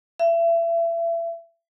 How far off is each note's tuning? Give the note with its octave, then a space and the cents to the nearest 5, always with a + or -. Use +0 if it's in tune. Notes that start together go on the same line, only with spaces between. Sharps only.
E5 +30